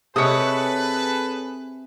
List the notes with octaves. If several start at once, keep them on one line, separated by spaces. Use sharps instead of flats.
C3 G#4 A4 B4 C#5 D#5 D#6